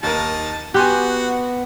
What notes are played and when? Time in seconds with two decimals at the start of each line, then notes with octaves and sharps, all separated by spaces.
0.03 D#2 D#4 A#4 A5
0.74 B3 F#4 G4 G#5 C6 F#6